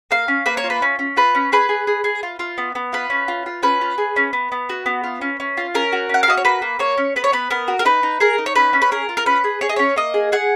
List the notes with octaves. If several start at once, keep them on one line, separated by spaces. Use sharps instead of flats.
A#3 F5
C#4
A#3 B4
C#5
F4
B4
C#4
C#4
F4 B4
C#4
G#4 B4
G#4
G#4
G#4
F4
F4
B3
B3
F4 B4
C#4
F4
F4
C#4 B4
F4
G#4
C#4
B3
B3
F#4
B3
F4
C#4
C#4
F4
C#4 A#4
F#4
C#4 F#5
F5
F#4 D#5
C#5
A#3 B4
A#3
A#3 C#5
C#4
B3 B4
C#5
B3 B4
B3 A#4
F#4
A#4
D#4 B4
D#4
G#4 A#4
D#4
C#5
C#4 B4
C#4
B4
G#4 A#4
F4
A#4
C#4 B4
G#4
G#4 C#5
D#5
C#4 C#5
A#3 D#5
G#4
G#4 F#5